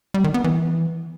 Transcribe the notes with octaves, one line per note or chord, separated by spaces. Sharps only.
G3
D#3
B3
E3